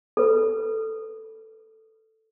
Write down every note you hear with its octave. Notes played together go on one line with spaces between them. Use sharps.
A4 B4